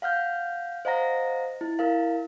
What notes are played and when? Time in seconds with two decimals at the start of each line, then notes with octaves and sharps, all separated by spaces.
0.02 F5 F#5 F6 G6
0.85 C5 D#5 F5 F#5 A#5 A#6
1.61 E4
1.79 E4 A#4 F5